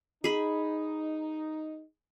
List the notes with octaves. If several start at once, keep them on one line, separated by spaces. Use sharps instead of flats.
D#4 G#4 B5